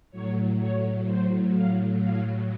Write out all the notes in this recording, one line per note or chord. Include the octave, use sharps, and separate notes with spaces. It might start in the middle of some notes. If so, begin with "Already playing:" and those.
A2 F#3 C#5
C#5
C5
F5
F5